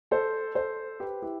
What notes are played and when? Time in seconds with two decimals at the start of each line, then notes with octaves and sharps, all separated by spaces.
0.11 A4 C5
0.55 A4 C5
1.00 G4 B4
1.22 E4 G4